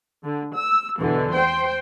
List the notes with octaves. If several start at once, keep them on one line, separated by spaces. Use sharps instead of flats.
D3
E6
E2 B2 D3 E3
C5 G5 C6